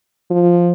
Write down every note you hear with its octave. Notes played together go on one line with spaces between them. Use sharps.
F3